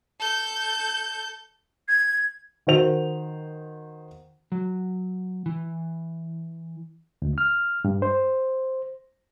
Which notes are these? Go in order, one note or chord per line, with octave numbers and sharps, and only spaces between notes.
A4 G6
G#6
D#3 F#4 C5 F7
F#3
E3
D2
F6
G2
C5